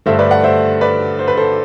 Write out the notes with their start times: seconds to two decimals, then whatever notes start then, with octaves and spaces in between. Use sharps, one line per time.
0.06 G2 D3 A3 C5 E5
0.19 B4 D5
0.31 D5 F#5
0.43 C5 E5
0.81 B4 D5
1.19 C5
1.28 B4
1.37 A4 C5